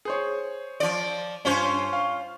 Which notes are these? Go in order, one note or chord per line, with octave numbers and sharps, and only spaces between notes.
G#4 C5 C#5
F3 D5
G2 C#4 F4 C5
F5